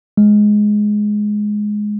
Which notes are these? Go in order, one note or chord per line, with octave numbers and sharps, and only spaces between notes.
G#3